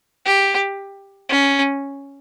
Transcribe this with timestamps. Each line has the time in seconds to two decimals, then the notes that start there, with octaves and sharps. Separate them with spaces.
0.26 G4
1.29 C#4